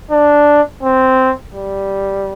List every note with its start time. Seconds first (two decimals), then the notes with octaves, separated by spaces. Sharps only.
0.11 D4
0.83 C4
1.55 G3